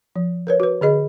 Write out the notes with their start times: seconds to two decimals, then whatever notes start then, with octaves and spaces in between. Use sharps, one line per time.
0.16 F3
0.47 A#4 B4 C#5
0.60 F#4 B4
0.81 D3 G#4 D#5 B5